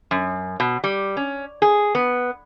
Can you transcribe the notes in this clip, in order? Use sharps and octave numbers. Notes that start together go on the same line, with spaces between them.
F#2
B2
G3
C#4
G#4
B3